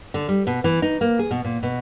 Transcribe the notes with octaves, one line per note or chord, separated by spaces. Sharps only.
D3
G3
B2
E3
D#4
A#3
G#4
B2
A#2
B2